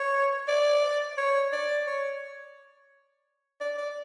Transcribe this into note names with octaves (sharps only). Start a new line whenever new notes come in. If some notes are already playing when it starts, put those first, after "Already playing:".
Already playing: C#5
D5
C#5
D5
C#5
D5
D5